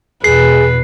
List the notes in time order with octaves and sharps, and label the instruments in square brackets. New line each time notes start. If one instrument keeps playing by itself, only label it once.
[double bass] E2 B2 [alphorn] G#4 [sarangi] B4 [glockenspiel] C7